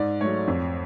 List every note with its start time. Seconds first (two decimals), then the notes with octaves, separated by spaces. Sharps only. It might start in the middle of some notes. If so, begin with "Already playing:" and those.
Already playing: G#2 D5
0.21 F#3 A3 C#5
0.47 F2